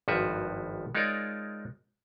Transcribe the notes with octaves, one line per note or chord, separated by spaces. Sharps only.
G#1 G2 F3 F#4 B4 E5
G#3 D#4 F4 A#4 C#5 D5